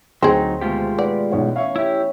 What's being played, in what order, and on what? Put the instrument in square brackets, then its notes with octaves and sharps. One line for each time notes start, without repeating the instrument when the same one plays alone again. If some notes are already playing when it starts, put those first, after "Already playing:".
[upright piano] D2 [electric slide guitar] F#3 D#4 [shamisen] C4 G#4
[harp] B2 D#3 A3 [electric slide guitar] G#3 F4 G4
[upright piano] B4 F#5 [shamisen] D5
[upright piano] B1 C#5 F#5 [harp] E3
[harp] C#4 C#5 C#6 [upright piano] E5 F5
[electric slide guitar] E4 G4 [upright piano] E5